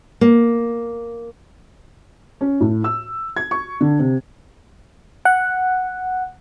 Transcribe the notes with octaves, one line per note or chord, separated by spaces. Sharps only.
A#3
C#4
A2
E6
G#6
C#6
D3
C3
F#5